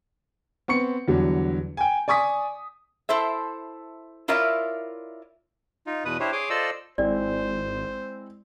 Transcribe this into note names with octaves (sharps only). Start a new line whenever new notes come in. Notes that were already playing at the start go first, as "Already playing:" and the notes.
B3 C4 C#6 C#7
E2 D3 F#3 G3
G5 G#5
D5 G#5 C#6 D#6 B6
E4 A4 C5 E5
E4 F4 A#4 C#5 D5 E5
D#4 F4
E2 B2 B4 D#6
D4 E4 G4 C5 C#5
G#4 C#5 C6 D6 D#6
F4 A4 C5 D5 D#5 E6
G#1 G#3 C4 E4 C5 D5